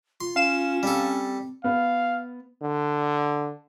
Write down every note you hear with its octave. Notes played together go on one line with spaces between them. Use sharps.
F4 C6
C#4 F5 E7
G3 C4 A4
B3 F5
D3